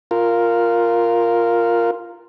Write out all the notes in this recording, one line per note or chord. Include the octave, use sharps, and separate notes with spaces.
F4 A#4